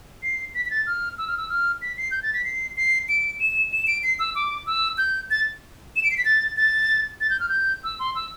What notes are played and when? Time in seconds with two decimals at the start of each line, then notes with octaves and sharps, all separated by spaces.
0.23 C7
0.54 B6
0.65 B6
0.71 A6
0.87 F6
1.18 E6
1.28 F6
1.37 E6
1.50 F6
1.82 B6
1.97 C7
2.11 G6
2.23 A6
2.33 B6
2.45 C7
2.77 C7
3.08 D7
3.40 E7
3.72 E7
3.87 D7
4.03 C7
4.19 E6
4.35 D6
4.67 E6
4.98 G6
5.31 A6
5.96 E7
6.04 D7
6.11 C7
6.18 B6
6.25 A6
6.57 A6
7.21 A6
7.30 G6
7.40 F6
7.49 G6
7.84 E6
7.99 C6
8.15 E6